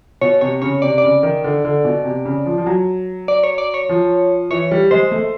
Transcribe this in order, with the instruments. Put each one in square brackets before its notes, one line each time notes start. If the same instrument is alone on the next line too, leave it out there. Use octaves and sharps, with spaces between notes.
[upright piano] B2 [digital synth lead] C#5
[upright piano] C3 [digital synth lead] C#5
[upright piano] C#3 [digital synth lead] C#5
[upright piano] C3 [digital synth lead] D5
[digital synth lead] D5
[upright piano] C#3
D#3
D3
D3
B2
C3
C#3
F3
F3
F#3
[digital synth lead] D5
C#5
D5
C#5
[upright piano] F3
[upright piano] E3 [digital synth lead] C#5
[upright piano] G3
[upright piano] G#3 [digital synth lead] C5
[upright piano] A3